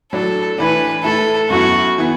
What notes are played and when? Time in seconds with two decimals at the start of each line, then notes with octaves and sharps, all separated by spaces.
0.13 A2 F#3 D4 A4
0.58 A2 E3 D4 B4
1.04 A2 A3 E4 A4
1.50 F#2 F#3 B3 E4 F#4
1.98 E3 B3